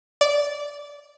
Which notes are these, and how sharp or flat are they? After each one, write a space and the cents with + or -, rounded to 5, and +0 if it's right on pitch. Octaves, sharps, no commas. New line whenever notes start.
D5 -15